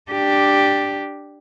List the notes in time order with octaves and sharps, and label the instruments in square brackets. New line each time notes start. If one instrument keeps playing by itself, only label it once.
[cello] D4 G4